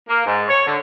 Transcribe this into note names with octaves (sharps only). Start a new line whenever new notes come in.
A#3
G#2
C#5
D3